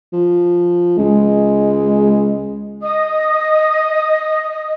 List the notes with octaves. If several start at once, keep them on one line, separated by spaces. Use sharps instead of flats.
F3
C#2 G#3
D#5 D#6